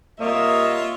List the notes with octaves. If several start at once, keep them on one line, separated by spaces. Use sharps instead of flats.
C3 G3 A#3 F4 C#5 D#5 E5